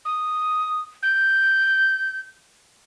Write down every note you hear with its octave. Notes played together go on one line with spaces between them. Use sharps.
D#6
G6